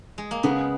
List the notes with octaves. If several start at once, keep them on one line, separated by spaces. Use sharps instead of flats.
G#3
A#3
C#3 G#3 B3